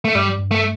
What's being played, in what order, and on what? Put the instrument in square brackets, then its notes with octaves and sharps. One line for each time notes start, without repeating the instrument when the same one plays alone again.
[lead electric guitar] A3
[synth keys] G2 [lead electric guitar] G3
[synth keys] G2
[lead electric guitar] A3